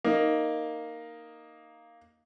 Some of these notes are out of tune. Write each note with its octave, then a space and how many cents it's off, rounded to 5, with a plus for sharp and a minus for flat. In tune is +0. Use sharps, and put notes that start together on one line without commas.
A#3 +0 D#4 +0